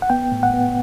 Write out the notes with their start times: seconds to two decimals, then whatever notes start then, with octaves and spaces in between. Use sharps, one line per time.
0.02 F#5
0.10 B3 G5
0.32 A2
0.43 F#5
0.54 B3